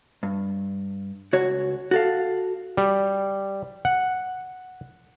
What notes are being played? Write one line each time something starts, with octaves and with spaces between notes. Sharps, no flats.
G2
C#2 F#4 C#5
F#4 A4 F5
G3
F#5